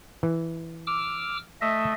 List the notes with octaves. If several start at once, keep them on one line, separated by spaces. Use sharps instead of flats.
E3
D6 E6 F6
A3 D#5 E5